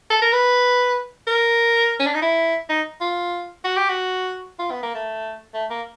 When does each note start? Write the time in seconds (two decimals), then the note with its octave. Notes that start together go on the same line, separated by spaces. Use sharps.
0.10 A4
0.22 A#4
0.33 B4
1.27 A#4
2.00 C#4
2.07 D4
2.15 D#4
2.22 E4
2.70 D#4
3.01 F4
3.64 F#4
3.77 G4
3.89 F#4
4.59 F4
4.71 B3
4.83 A#3
4.95 A3
5.54 A3
5.70 A#3